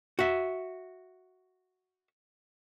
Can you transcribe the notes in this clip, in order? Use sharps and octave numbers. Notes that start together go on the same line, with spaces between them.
F#4 E5